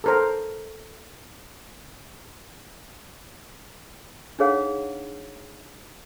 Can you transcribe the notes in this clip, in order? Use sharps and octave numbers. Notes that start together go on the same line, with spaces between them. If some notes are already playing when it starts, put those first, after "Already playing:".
A4 A#4 C5
D4 D#4 G#4 C#5 F5 F#5